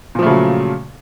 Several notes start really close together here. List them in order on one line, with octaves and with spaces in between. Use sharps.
A#2 F3 A3 C#3 F#3